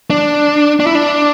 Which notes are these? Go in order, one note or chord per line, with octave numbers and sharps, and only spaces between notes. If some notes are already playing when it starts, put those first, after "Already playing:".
D4
D4
E4
D4